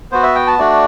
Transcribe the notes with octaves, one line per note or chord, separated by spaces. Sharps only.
B3 F#4 C5
E5
G5
A5
A3 D4 F#4 D5